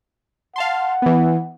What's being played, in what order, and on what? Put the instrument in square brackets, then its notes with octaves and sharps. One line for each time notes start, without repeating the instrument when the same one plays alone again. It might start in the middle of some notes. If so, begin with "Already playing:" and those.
[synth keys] F5 A5 C6 [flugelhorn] F#5
[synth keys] E3 B3